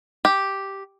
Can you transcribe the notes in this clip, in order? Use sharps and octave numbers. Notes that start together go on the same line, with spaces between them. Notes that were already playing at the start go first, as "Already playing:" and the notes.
G4